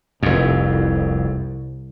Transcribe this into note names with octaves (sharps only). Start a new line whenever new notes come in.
F1 C2 F2